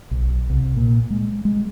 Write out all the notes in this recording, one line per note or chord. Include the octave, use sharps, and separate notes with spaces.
B1
C2
A#2
G#3
G#3